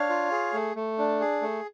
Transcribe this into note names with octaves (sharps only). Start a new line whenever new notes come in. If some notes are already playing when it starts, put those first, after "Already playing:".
Already playing: D4 C#5 F5
F4
G#4
A3
A3
D4
G#4
A3